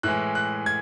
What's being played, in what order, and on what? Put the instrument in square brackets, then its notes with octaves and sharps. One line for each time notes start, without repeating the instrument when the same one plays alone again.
[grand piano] A2 E3 G#3 F#6
F#6
G#6